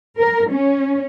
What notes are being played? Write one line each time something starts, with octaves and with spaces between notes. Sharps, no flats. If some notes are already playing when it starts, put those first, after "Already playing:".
A#4
C#4